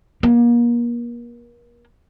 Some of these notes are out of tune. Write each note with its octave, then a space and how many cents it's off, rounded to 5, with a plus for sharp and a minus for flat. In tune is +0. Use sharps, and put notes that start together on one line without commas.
A#3 +35